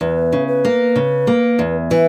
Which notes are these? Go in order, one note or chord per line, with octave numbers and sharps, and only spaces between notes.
E2 B4
C#3
B4
A#3
C#3
A#3
E2
E3 B4